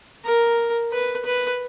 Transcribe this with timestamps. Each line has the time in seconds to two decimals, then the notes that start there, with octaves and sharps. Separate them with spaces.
0.25 A#4
0.92 B4
1.25 B4